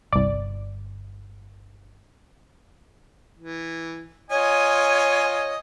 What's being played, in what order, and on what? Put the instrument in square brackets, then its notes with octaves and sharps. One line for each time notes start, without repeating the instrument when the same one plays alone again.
[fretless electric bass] G1 [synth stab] C2 D5
[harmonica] E3
[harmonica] F4 D#5 G#5 [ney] C#5